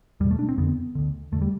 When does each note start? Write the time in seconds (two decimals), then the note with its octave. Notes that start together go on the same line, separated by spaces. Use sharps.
0.20 E2 G3
0.24 B2
0.31 A3
0.39 D4
0.49 C4
0.58 F2 D3 B3
0.95 D2 D3
1.32 E2 D3 A3
1.42 G3